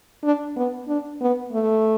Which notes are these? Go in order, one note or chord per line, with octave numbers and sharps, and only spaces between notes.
D4
B3
D4
B3
A3